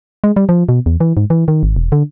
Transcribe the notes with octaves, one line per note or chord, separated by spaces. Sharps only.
G#3
G3
F3
B2
E2
E3
G#2
E3
D#3
G#1
E1
D3